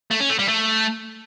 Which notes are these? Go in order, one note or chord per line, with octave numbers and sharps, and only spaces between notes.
A3
C#4
A3
G3
A3